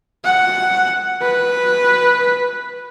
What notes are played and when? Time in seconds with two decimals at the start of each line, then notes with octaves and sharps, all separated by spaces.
0.25 F#5
1.22 B4